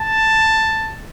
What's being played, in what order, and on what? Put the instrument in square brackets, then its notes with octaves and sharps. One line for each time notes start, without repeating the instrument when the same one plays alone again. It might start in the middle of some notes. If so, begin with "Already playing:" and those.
Already playing: [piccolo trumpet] A5